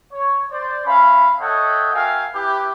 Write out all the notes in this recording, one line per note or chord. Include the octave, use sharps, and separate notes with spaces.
C#5
C5 D5
C#4 E5 F5 B5
A4 C#5 D#5 E5 F#5 G5
F#4 A#4 E5 F5 G5 G#5
E4 G4 B4